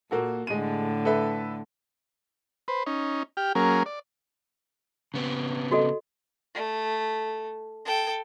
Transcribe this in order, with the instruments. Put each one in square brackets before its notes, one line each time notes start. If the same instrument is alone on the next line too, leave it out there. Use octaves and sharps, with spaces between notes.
[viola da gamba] A#2 [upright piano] A#3 F#4 A4
[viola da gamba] A2 D3 [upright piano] G#3 D#7
[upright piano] A4 B4 E5
[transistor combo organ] B4 C5
C#4 D#4
G4 G5 F6
F#3 A#3 C#4 G#4 A#4
D5
[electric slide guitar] C#3 B3 C4
[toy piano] F#4 A4 D#5
[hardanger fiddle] A3
A4 G5